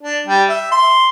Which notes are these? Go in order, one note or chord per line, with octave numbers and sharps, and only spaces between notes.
D4
G3
E5
C6